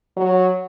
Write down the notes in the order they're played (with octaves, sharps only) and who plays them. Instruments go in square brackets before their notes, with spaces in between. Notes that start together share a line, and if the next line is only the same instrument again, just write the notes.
[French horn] F#3